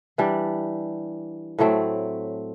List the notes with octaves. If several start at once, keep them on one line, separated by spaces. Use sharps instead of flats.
E3 G3 D4
A2 F#3 A3 C4